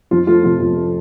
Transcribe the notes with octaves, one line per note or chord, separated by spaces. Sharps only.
F2 F3 F4
F3 A3 F4
C3 F3 F4
F2
A3